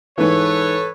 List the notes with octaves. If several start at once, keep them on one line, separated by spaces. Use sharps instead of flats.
G#2 E3 A4 B4 C#5